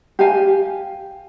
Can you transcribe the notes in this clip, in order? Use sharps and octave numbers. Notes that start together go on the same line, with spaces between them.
G4 F5 G#5